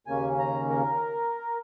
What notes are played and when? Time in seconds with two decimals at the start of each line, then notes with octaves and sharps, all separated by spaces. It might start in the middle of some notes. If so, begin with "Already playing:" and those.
0.07 D#2 C#3 A#3 C#4 G#5
0.39 A#5
0.69 A#4